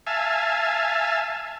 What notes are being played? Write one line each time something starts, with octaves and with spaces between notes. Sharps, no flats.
E5 F5 G#5 A5